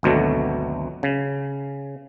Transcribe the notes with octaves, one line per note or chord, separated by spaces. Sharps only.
G#1 D2 B2 F#3 A3
C#3